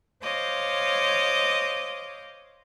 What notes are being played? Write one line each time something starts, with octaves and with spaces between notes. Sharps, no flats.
C5 C#5 D#5 F5 D6